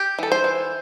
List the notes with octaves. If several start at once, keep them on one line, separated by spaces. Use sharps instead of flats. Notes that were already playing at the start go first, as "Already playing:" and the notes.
Already playing: G4
E3 A4
C5
E3